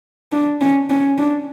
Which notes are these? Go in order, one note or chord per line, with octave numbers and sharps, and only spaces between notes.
D4
C#4
C#4
D4